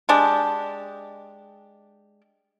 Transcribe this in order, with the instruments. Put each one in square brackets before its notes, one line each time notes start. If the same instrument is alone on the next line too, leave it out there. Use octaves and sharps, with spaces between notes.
[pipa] G#3 D4 G4